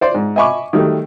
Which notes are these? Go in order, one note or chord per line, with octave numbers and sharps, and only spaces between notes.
C5 D5 C6
G#2
D#5 E5 G#5 B5 C#6 D6
D#3 F#3 G3 A3